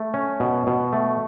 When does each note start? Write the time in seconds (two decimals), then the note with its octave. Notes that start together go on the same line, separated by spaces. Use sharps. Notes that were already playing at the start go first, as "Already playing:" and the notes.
Already playing: A3
0.14 C#4
0.40 B2
0.67 B2
0.93 A3